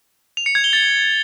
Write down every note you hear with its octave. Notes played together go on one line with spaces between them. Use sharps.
F7
C#7
G#6
G7
A6